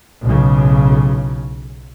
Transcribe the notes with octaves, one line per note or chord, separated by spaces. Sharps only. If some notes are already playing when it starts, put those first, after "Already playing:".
B1 A2 C#3